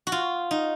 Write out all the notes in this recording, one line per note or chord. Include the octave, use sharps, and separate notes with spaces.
F#4
F4
D#4